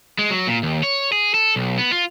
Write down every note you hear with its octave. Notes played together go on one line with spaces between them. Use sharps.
G#3
F#3
A#2
D#2
C#5
G#4
A4
B1
B3
F4